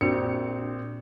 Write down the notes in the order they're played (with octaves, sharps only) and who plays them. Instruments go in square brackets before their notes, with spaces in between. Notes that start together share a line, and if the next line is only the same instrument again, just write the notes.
[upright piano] A#1 C4 C#7 [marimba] D4 F#4